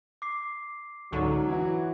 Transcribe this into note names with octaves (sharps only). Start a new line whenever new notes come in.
D6 C7
C#2 G#2 D3 F#3 C#6
E3 E4 F#4